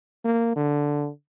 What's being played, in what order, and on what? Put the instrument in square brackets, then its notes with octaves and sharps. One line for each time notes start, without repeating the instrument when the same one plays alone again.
[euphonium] A#3
D3